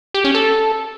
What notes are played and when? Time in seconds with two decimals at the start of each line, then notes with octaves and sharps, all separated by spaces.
0.14 G4
0.24 C#4
0.35 A4